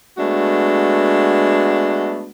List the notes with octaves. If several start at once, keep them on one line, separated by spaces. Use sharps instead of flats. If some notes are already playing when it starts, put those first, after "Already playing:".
G#3 A3 B3 D4 F#4